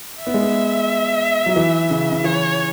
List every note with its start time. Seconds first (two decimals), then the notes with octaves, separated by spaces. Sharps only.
0.19 E5
0.27 B3
0.34 G#3
0.41 B3
1.46 F#3
1.56 E3
1.90 C#3
2.12 C#3
2.24 E3 C#5